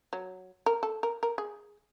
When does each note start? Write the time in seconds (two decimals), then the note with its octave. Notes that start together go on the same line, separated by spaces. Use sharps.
0.13 F#3
0.66 A#4
0.83 A4
1.03 A#4
1.23 A#4
1.38 G#4